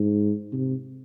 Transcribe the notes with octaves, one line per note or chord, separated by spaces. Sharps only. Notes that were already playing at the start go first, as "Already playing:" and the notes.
Already playing: G#2
C3